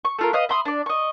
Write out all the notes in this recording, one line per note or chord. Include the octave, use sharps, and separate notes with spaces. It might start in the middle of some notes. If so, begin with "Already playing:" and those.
C#6
A3 F4 A#4
B4 D#5 F5 D#6
E5 B5 C6 D#6
D4 D5
D#5 C#6